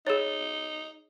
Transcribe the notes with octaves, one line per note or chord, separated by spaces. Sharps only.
D#4 G#4 C#5